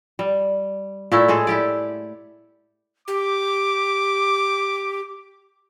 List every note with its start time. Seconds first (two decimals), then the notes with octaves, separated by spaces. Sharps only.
0.19 G3
1.12 A#2 A3 E4
1.28 A2 G#3 G#4 A4
1.47 E4 G4 D5
3.08 G4 D6